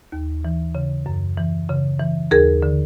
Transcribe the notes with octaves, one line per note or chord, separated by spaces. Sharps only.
D#2
E3
C#3
F#2
E3
C#3
E3
D#2 G#4 A#4
D3